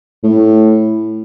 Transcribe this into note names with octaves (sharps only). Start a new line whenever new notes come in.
A2